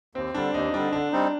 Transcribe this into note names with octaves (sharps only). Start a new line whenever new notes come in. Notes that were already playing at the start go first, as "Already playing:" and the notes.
D#2 C4
D3 G3 D4
D#2 D#4
D3 G3 D4
D3 D4
G3 C4 D#4